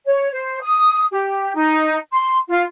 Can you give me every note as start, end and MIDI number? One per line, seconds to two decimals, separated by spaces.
0.07 0.30 73
0.33 0.60 72
0.62 1.04 87
1.11 1.53 67
1.55 1.97 63
2.12 2.35 84
2.48 2.62 65